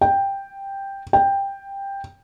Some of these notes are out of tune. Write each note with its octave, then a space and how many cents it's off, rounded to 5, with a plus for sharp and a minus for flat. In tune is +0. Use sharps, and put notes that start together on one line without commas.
G5 +5
G5 +10